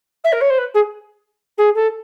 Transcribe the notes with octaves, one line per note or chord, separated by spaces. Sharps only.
E5
A#4
C#5
C5
B4
G#4
G#4
A4